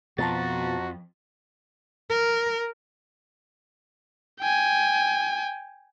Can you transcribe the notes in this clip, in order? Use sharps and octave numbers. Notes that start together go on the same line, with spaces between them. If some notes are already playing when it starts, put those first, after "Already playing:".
F2 B2 F3 F#4 A5 A#5 A6
A#4
G5 G#5